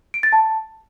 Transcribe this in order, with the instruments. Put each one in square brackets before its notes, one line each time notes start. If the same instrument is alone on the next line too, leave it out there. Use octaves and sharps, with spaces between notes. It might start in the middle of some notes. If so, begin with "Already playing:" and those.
[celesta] D7
A6
A5